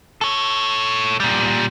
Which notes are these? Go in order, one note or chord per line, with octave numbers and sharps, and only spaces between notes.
A4 C#5
A#2 G3